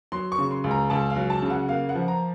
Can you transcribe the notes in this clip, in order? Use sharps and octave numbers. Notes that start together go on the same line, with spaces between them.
F#3 C6
C#6
C#3
C6
C#2
A#5
C#2 A5
F5
F#3
A5
C#3
F#5
A#3 F5
F#5
F3
A#5